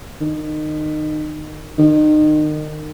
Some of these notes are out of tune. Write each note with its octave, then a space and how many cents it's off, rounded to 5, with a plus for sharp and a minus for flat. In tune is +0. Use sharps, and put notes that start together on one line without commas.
D#3 -25
D#3 -30